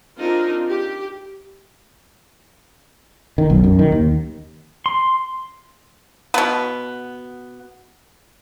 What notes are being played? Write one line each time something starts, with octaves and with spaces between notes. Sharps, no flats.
C4 D4 D#4 F4 A#4
G4
D#3
B1
F#2
D#3
D#2
C6
B2 B3